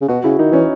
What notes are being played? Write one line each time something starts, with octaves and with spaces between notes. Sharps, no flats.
C#3
B2 F#4
C#3 E4
D#3 D#4
E3 C#4